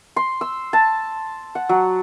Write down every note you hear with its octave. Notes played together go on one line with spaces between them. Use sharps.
C6
E6
A5
F#5
F#3